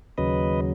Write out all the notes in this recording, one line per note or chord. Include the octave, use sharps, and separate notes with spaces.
D#2 C#3 F#3 B4 D#5